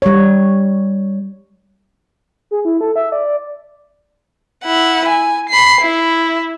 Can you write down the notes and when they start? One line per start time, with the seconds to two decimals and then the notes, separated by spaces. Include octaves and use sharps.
0.02 G3 C#5
2.51 G#4
2.65 E4
2.81 A4
2.96 E5
3.12 D5
4.64 E4 F#5
5.09 G#5
5.49 B5 C7
5.81 E4